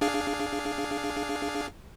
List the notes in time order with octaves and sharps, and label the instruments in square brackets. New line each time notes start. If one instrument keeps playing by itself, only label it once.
[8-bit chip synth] D4 G#4 F5